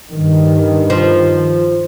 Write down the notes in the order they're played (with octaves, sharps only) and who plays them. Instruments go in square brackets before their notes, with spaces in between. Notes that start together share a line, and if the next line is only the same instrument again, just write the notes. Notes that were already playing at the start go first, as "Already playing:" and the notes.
[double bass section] G2 D#3
[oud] F3